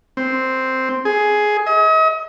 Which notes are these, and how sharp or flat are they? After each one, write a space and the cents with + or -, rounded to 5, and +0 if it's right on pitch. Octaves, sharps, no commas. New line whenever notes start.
C4 +0
G#4 +10
D#5 +40